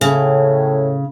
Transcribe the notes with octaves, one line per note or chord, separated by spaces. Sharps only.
A2 C#3